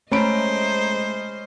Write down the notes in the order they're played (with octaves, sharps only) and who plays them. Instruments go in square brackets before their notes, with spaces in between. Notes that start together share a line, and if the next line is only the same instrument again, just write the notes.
[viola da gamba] G#3 C5 D#5 [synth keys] A3 A#5 [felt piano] C#4 B5 D7